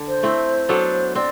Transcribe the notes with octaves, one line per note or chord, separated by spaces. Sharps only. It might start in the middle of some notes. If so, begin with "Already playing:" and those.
Already playing: D3
C5
A3 C4 E4
F#3 B3 D4 A4
C4 D5